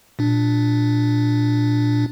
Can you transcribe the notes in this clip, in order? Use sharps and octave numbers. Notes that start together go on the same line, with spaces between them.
A#2 D4